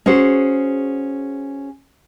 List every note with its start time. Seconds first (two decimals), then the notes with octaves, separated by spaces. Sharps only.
0.06 C#4 F#4 G#4 C5